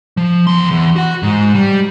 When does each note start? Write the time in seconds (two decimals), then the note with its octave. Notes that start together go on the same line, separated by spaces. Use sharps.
0.17 F3
0.47 E2 C6
0.71 E2
0.96 F#4 F#5
1.23 G#2
1.55 G3